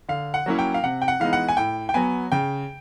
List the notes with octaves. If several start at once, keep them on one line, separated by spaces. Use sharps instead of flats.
D3 F5
F#5
F#3 A#3 C#4 E4
G5
F5
C3 F#5
G5
F#5
E3 G#3 B3 D#4 F5
F#5
G#5
A2 G5
G5
F#3 B3 G#5
C#3 G5